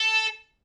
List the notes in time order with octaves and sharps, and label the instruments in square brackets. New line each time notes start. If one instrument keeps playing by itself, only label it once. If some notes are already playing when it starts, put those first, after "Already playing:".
Already playing: [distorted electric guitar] A4